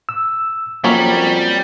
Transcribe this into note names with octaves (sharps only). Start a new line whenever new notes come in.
E6
F2 F#3 G3 A#3 C#4